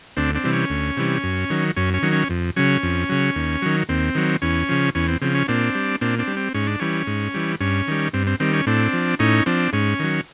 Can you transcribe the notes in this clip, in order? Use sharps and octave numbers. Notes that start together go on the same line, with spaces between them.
D2 C4 D4
C4 D4
C3 E3 G3
C#4
D2
C3 E3 G3
F#2
D#3 F#3
F#2 C#4
C#4
D#3 F#3
C#4
F2
C#3 F#3 C#4
F2
C#3 F#3
D#2
D#3 F#3
D#2 C4
D#3 F#3
E2 C#4
C#3 F3
E2 C#4
C4
C#3 F3 C4
C#4
A#2 C4 D4
G3
A#2 C4 D4
C4 D4
G3
C4
G#2 C#4
D4
E3 G3 C#4
G#2
E3 G3
G2 C#4
D#3 G3
G2 C4
C4
D#3 G3 C4
C#4
A2 C4 D4
F3
A2 C#4 D#4
F3 C4 D4
G#2 C#4
D#3 F#3